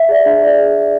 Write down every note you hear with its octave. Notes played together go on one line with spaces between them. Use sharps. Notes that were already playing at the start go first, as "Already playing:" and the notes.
Already playing: E5
G#4 D5
D4
G#4 D5